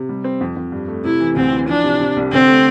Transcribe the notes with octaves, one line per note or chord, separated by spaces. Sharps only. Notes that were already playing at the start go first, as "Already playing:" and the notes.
Already playing: C3
G3
C4
F2
F2
G2
A3
C3 E4
E3
D2 C4
E3
F3 D4
C3
C3
C2
D3 C4
A3